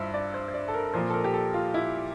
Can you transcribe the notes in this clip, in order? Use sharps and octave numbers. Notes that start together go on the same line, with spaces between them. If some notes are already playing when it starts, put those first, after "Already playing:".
Already playing: G2 E4 F4 C5 E5
D5
C5
C5
D5
A4
A#4
A#2 F3 A#3 C5
A4
A#4
G4
A4
F4
E4